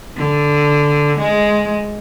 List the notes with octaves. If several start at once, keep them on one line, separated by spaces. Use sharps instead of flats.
D3
G#3